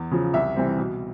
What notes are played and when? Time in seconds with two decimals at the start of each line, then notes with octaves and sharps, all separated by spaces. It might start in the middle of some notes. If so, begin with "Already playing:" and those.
Already playing: E2
0.11 C#3 F3
0.33 C2 E5
0.56 C3 E3 G3 C4
0.78 B2